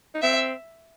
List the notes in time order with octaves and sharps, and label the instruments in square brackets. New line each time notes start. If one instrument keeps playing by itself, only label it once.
[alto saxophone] D#4
[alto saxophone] C4 [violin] E5